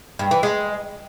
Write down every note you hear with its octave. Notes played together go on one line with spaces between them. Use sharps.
G2
E3
G#3